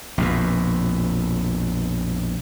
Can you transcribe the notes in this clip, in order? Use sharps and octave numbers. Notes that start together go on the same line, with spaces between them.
A#1 F2 B2